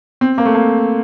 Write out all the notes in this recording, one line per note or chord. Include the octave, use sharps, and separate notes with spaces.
C4
A#3
A3
A#3